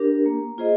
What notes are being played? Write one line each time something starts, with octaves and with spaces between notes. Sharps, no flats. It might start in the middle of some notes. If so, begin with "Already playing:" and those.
Already playing: D4 G4 A#4
A#3
F4 G#4 C5 D#5